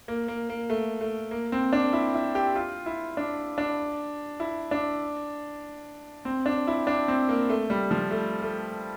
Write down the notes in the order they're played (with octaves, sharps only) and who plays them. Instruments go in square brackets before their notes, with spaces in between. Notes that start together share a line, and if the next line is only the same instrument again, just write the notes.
[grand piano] A#3
A#3
A#3
A3
A3
A#3
C4
D4
E4
E4
G4
F4
E4
D4
D4
E4
D4
C4
D4
E4
D4
C4
A#3
A3
G3
F3
A3
A3